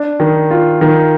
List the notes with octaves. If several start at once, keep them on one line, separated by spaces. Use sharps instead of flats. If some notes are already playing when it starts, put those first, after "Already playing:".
Already playing: D4
D#3
F4
D#3